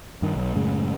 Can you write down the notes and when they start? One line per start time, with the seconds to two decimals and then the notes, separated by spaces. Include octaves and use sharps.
0.22 G2 D#3
0.35 B1
0.55 F#2 A2 C#3 G#3